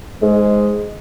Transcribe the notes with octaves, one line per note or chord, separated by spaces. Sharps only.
G#2 G#3